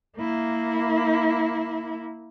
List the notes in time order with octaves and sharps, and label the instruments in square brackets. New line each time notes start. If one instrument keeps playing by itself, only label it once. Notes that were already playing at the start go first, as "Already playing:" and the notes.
[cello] A#3 E4